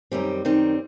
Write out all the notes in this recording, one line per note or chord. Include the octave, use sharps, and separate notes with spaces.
F#2 D#3 G3 C4
F#2 D#3 G3 C4